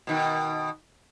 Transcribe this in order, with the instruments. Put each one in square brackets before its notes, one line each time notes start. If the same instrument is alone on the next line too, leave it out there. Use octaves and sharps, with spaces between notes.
[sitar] B2 D#3